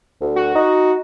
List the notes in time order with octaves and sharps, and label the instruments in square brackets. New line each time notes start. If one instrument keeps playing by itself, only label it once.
[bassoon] D2
[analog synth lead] F#4
[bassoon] D#4